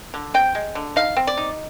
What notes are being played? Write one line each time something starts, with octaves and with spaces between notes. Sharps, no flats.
D3
C4 G5
G#3
D3
D#4 F5
C4
D5
D#4